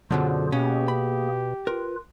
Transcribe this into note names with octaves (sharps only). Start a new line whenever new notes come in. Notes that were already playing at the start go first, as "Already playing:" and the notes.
F#2 B2 D3 F#3 F4 G#4 C5
B2 A#3 C#4 G4 G#4
B5
F4 A#4 B4